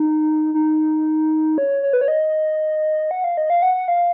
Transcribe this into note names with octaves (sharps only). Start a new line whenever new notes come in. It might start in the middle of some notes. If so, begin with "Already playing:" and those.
Already playing: D#4
D#4
C#5
C#5
B4
C#5
D#5
F#5
F5
D#5
F5
F#5
F5